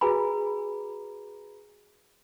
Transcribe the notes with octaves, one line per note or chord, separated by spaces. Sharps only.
F#4 G#4 B4 G#5 A#5 B5